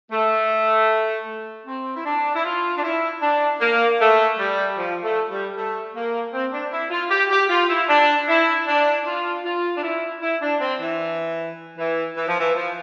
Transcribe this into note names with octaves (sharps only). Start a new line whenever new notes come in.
A3
C4
E4
D4
E4
F4
D4
E4
D4
A#3
A3
G3
F3
A3
G3
A3
A#3
C4
D4
E4
F4
G4
G4
F4
E4
D4
E4
D4
F4
F4
D4
E4
E4
D4
C4
E3
E3
E3
F3
E3
F3